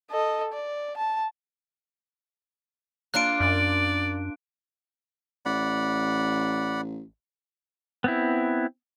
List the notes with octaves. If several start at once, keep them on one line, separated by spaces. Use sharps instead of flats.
A4 D#5
D5
A5
A#3 D4 F4 F#6 D7
F#2 D5
A1 D5 F#5 B5
B3 C4 E4